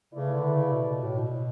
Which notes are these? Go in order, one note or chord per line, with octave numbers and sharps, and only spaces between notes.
C#3 A3 E4 B4 D5
D3
C#3
B2
B2
A2
B2